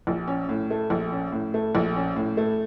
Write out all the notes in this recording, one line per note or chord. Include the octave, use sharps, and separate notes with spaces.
A#1
C#4
A2
A3
A#1
C#4
A2
A3
A#1
C#4
A2
A3